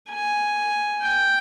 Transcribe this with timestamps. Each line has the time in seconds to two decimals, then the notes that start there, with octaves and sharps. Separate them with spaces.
0.10 G#5
1.02 G5